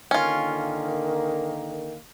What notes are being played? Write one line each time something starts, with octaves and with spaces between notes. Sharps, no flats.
D3 D#3 A#3 C#4 F4